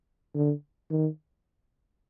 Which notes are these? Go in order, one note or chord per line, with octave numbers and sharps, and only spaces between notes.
D3
D#3